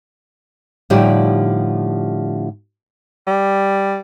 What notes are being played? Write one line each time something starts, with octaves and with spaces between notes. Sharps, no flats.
A2 D3 F3 G3 D#4 G4
G3